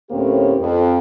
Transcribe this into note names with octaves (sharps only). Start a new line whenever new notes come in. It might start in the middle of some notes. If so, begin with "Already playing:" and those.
D2 A2 A#3 C4 C#4 G4
F2